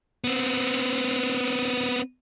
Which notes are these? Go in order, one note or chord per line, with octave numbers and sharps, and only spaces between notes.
B3 C4